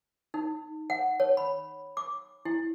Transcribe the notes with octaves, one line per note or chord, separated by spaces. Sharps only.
D#4
F#5
C#5
B5
D6
E4